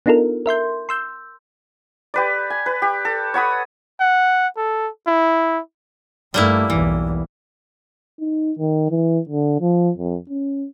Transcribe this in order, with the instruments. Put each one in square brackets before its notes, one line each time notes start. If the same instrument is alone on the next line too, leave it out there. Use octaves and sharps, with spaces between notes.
[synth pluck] B3 D4 D#4 F4 A4 A#4
A#4 E5 C6 G6
C6 E6 G6
[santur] G4 B4 D5
G#5
B4
G4
A4
C#5 F#5 B5 D#6
[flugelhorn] F#5
A4
E4
[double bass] G2 A3 [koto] G3 A#3 E4
[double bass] B1 E2 [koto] E3
[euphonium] D#4
D#3
E3
D3
F3
F2
C#4